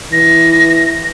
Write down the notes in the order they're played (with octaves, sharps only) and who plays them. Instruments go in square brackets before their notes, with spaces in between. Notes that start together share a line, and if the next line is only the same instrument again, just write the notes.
[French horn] E3 [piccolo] A#6